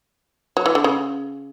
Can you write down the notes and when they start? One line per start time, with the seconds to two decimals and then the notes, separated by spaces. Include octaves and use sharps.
0.57 F#3
0.66 E3
0.75 D3
0.84 C#3